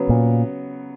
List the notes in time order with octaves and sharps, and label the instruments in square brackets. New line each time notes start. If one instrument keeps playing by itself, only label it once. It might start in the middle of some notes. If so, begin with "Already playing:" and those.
Already playing: [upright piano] C#3 F#3 B3
[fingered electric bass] A#2